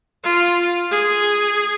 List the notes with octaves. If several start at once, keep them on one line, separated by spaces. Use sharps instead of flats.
F4
G#4